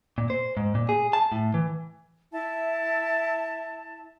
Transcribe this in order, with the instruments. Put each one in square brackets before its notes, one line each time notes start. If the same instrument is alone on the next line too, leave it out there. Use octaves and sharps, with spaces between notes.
[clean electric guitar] A#2
C5
G#2
A#2
G#4
A5
A2
E3
[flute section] E4 E5 A5